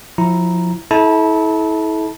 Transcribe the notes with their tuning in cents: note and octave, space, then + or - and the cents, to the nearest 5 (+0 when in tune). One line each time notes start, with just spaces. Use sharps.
F3 +25 E4 +0 A#5 +0
E4 -30 A4 -35 A5 +0